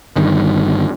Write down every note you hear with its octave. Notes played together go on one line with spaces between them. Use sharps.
G1 G2 D#3